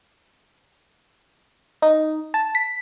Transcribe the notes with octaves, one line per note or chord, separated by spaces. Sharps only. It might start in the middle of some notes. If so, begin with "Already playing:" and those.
D#4
A5
B6